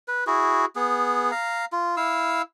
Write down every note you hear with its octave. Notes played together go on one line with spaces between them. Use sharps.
B4
E4 F#4 G#4
B3 G#4
F5 A#5
F4
E4 F5 E6